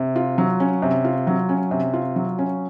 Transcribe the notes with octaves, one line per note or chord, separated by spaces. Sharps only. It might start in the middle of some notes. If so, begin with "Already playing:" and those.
Already playing: C3
F4
F#3
C#4
C3
F4
F#3
C#4
C3
F4
F#3
C#4